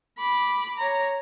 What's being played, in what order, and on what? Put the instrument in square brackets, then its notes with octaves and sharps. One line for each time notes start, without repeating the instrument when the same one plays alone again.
[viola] B5 D6
C#5 A#5